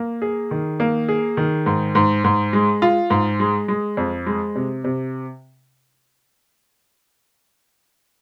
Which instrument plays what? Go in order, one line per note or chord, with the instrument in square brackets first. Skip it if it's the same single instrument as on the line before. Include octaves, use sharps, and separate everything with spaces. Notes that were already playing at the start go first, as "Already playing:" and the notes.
Already playing: [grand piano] A#3
G#4
D#3
A#3
G#4
D#3
G#2
G#2
G#2
G#3
F4
G#2
G#3
G#3
F2
G#3
C3
C3